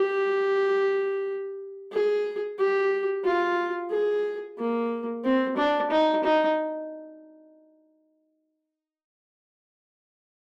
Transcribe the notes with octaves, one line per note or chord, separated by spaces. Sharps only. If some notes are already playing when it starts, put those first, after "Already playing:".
Already playing: G4
G#4
G4
F4
G#4
A#3
C4
D4
D#4
D#4